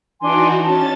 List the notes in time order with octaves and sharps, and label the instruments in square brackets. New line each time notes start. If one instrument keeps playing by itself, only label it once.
[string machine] E3 D#4 F#4 [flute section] D4 G#5 C6
[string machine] C#4 A6 [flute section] A5